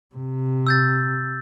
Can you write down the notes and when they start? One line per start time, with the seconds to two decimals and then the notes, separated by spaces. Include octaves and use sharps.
0.15 C3
0.67 E6 G6 A6